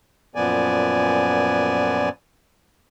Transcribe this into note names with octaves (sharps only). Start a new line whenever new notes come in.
F#2 A#2 F3 B3 D5 G#5